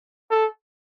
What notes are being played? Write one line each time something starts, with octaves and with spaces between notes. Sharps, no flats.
A4